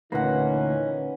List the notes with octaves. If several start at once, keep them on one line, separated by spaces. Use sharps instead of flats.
D2 A#2 E3 A#3 C#4 D#4 B4 F#5